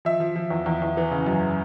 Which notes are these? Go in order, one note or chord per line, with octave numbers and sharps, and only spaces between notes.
F3 E5
F3
F3
E2
E2
E2
E3
C#3
F#2